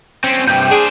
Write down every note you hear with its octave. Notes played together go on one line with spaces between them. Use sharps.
C4 C#4
G2 C3 G5
D4 G#4 C5